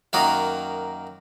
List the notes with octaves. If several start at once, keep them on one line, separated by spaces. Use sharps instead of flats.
F#2 D#3 A#3 F#4 D#6